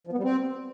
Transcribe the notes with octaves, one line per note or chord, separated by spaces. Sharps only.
F3
B3
G3
C4